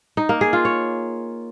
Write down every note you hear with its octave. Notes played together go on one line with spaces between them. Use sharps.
D#4
A#3
G#4
F4
C#5